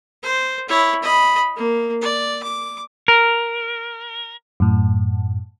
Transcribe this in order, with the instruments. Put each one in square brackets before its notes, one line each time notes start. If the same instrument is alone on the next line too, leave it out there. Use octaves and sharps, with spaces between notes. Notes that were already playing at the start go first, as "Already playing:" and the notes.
[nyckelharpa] C5
E4 C#5
D#5 B5
A#3
D5
D6
[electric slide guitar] A#4
[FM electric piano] F#2 A2